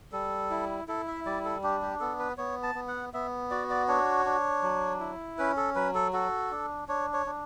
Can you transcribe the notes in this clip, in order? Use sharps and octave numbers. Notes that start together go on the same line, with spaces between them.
G3 A4
E4
E4 A4
E5
G3 D5
A4
D4 G4
G4
B3 A4
B4
B3 C#5
A5
B3
F#5
B3 E5
F#4 D5
D5
D4 C#5
D4
F#3
E4
C#4 B4
A4
F#3 B4
A4
F#4 A4
D4
D4 C#5
C#5
D4